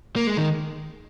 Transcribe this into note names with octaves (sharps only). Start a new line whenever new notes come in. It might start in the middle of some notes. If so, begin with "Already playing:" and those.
A#3
G#3
D#3